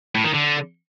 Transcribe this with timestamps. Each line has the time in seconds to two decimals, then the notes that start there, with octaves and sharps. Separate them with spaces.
0.15 A2
0.24 D#3
0.33 D3